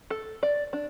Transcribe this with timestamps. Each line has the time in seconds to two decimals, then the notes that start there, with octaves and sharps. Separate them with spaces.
0.10 A4
0.43 D5
0.73 D4